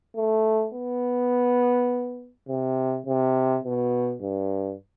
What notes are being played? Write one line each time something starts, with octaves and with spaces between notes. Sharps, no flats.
A3
B3
C3
C3
B2
G2